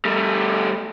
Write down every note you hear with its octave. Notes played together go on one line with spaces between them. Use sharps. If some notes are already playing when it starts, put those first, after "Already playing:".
G3 A3